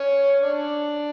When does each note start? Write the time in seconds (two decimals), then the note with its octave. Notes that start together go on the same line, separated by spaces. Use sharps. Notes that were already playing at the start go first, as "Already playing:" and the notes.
Already playing: C#4 C#5
0.42 D4 D5